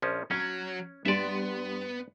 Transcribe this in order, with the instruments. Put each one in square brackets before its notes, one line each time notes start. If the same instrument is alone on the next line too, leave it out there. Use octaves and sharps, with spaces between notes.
[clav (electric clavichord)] A#1 F3 C#4
[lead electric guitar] F#3 [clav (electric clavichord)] C#4 [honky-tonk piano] G#6
[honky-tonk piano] G2 G3 C6 [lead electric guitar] B3 [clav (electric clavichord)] D5 E5